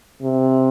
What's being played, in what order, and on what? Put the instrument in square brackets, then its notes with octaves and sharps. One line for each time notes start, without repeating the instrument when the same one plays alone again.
[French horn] C3